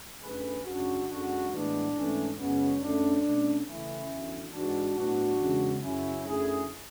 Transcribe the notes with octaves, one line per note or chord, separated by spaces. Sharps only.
F#2 D3 A3 G#4 B4
F#2 C#3 G#3 C#4 D4 F#4
F#2 D3 G#3 D4 F#4
A2 E3 G#3 B3 D4
G#2 E3 A3 C#4
F#2 C#3 G#3 B3 C#4
F#2 D3 A3 C#4 D4
B2 A3 C#4
C#3 E3 A3 C#4 E4
E2 D3 F#3
G#2 E3 G#3 D4 F#4
A2 F#3 B3 D4 F#4
E2 C#3 G#3 C#4
F#2 C#3 F#3 C#4 E4
F#2 D3 A3 E4 G#4